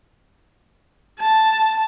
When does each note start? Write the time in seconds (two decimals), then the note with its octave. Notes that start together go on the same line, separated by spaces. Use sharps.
1.19 A5